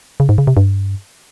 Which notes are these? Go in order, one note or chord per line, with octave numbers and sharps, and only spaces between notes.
C#3
G#2
C#3
C3
G2